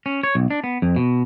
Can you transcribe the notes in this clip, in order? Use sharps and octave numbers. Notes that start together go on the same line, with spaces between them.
C#4
C#5
B1
D4
B3
F2
B2